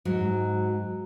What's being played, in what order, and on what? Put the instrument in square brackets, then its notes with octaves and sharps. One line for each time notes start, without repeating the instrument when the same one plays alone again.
[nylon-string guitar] G#2 F#3